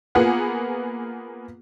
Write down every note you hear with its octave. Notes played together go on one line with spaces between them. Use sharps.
A#3 B3 F4 G#4 B4 F#5